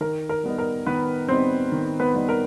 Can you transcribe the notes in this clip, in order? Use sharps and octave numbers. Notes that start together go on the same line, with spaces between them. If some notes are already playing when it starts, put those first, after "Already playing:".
D#3 A#4
A#4
G3 B3 D#4
A#4
D#3 B3 B4
G3 B3 C4 D#4 C5
D#3
B3 B4
G3 B3 D#4
A#4